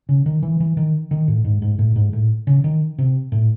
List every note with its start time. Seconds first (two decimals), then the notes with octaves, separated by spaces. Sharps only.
0.09 C#3
0.26 D#3
0.43 E3
0.60 E3
0.77 D#3
1.11 D#3
1.28 A2
1.45 G#2
1.62 G#2
1.79 A2
1.96 G#2
2.13 A2
2.47 C#3
2.64 D#3
2.99 C3
3.32 A2